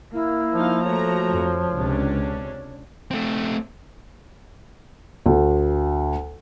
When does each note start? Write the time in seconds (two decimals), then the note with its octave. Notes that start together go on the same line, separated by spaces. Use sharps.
0.13 A#3 E4
0.54 F3 D#4 F5
0.84 A3 F#4 C#5 A#5
1.30 F2
1.73 C#2 C3 C#4 D4
3.11 A3 C4
5.26 D2